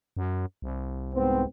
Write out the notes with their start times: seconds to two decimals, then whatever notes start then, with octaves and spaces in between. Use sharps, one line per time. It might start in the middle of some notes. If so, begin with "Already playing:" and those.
0.17 F#2
0.62 C2
1.13 G#2 B3 C4